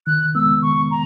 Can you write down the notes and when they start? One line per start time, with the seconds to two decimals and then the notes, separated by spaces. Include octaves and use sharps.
0.06 D#3 F#6
0.35 G#3 B3 E6
0.62 D#3 C#6
0.91 A#5